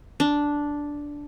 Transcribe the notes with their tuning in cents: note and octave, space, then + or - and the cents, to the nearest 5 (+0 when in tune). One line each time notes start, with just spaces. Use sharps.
D4 -5